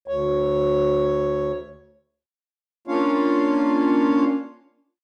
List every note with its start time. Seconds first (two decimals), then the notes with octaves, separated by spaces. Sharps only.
0.08 D2 C#5
2.88 A#3 C#4 D4 F4 C#5 F5